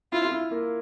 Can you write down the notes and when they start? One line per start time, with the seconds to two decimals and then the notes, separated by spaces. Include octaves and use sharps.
0.12 E4 F4
0.25 F4
0.32 E4
0.51 A#3